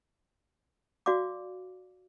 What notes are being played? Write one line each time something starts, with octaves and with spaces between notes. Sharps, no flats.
F#4 D5 F5 D6